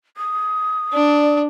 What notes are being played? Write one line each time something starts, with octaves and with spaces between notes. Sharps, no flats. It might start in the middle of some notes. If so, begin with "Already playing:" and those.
D#6
D4 D5